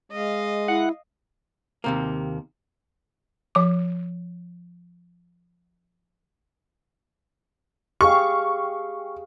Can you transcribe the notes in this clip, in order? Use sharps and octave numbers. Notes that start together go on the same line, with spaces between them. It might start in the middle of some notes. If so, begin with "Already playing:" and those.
G#3 D#5 F5
E4 F#5
D#2 C3 A#3
F3 D6
G4 G#4 F5 C#6